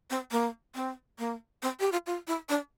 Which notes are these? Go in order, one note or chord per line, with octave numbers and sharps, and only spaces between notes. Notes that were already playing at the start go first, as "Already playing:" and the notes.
C4
A#3
C4
A#3
C4
G4
F4
F4
E4
D4